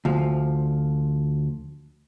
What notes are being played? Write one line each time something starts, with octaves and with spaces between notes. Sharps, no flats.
D2 F3